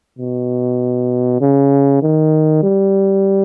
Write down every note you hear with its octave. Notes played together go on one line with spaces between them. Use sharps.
B2
C#3
D#3
G3